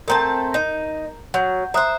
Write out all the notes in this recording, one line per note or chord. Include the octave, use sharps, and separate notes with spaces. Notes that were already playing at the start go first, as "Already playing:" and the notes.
A3 C4 A#4 A5 A#5 G6
D#4
F#3 F#5 G6
C5 E5 A#5 D#6 F#6